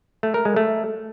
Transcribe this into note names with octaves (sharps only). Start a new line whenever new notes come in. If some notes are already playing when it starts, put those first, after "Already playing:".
A3
A#4
G#3
A3